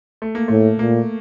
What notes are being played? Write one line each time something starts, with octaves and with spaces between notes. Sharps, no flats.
A3
A#3
A2 A3
A#2 A#3